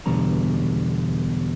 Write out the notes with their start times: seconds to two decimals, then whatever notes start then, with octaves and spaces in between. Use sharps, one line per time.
0.06 E2 B2 D3 G3 A#5